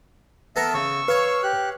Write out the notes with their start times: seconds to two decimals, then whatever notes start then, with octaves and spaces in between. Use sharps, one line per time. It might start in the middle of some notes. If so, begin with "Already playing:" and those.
0.56 B3 A4 A#4 E5
0.74 C#3 C#6 E6
1.08 B4 C#5 F5
1.43 G4 F#6